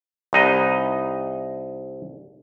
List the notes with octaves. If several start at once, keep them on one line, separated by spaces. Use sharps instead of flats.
C2 D#4 D#5